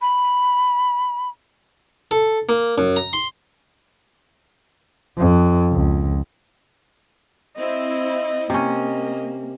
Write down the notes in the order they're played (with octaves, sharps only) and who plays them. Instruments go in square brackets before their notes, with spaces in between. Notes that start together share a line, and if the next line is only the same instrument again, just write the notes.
[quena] B5
[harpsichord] A4
A#3
F#2
A#5
C6
[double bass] F2
C#2
[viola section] C4 E4 [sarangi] D#5
[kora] C3 C#4 [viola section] A#3 [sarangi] D#5